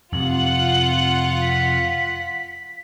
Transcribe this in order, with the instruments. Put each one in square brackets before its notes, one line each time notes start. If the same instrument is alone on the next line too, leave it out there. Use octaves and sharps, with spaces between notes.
[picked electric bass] F2 C3 [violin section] F4 F#5 [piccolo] F#7
[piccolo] B6